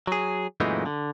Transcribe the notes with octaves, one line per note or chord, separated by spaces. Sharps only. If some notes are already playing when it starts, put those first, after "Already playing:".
F#3 G#4
F#2 A#2 E3 G#3 A3 D#4
D3